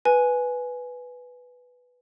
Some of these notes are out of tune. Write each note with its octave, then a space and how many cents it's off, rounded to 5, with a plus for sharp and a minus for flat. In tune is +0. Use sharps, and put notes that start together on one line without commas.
B4 +0 G#5 +10